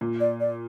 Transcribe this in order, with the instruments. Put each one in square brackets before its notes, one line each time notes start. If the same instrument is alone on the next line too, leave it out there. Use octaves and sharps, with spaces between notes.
[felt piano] A#2
[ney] D5
D5